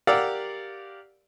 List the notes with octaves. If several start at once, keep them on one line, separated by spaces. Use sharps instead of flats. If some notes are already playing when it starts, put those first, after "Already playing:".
G4 A#4 D5 F5 F#5 E6